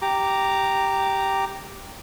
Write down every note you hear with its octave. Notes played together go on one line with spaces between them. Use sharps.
G4 A#5 D6